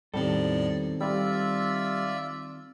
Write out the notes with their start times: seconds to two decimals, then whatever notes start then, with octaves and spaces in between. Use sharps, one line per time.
0.14 E2 A2 D#3 G3 C4 A4 D5
1.01 G3 F4 D5 E5 E6